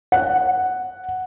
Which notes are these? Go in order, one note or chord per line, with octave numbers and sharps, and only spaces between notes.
F#5